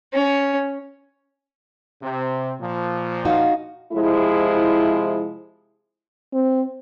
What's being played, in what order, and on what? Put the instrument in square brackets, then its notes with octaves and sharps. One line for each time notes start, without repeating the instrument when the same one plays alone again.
[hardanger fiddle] C#4
[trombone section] C3 C4
A#2 F3
[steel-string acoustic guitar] D#4 F#4 [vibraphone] F5
[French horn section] C3 F3 G#3 E4
[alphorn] C4